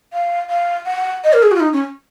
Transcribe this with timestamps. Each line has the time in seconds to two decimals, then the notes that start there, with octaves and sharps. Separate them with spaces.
0.13 F5
0.50 F5
0.86 F#5
1.24 D#5
1.33 A#4
1.43 G#4
1.51 F#4
1.55 F4
1.60 D#4
1.73 C#4